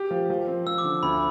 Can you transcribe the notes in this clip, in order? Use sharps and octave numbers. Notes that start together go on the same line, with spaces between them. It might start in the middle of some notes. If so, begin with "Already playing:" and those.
Already playing: G4
F3
F3
C4
F3 E6
D6
D3
D2 B5